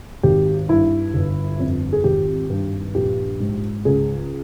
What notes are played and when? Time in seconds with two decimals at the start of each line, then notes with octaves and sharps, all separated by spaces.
0.23 G#1 G4
0.69 G2 E4
1.14 G1
1.59 F2
1.93 G#4
2.04 G#1 G4
2.50 G2
2.95 A#1 G4
3.40 G#2
3.85 C#2 G#4